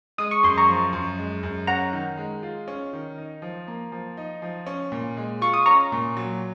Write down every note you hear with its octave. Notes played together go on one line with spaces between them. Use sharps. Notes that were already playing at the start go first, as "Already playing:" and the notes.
G#3 D#6
C#6
F#2 C6
A#5 C#6
F3
F#2
G#3
F#2
C#4 F#5 A#5
D#3
G#3
F4
C#4
D#3
D#4
F3
A#3
F3
D#4
F3
C#4
A#2
G#3
F4 C#6
D#6
C#4 A#5 C#6
A#2
F#3